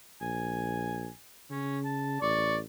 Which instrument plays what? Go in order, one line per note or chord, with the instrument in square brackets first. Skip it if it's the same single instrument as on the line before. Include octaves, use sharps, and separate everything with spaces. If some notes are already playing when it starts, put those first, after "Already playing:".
[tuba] A#1 [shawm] G#5
[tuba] C#3 [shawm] C#4
[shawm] A5
[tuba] A1 [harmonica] D5 [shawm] C#6